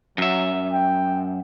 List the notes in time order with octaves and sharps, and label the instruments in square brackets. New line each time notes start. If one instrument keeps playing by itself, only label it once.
[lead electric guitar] F#2 E5 [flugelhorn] F#3
[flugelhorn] G5